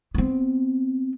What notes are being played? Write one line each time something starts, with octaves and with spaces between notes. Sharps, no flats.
B3 C4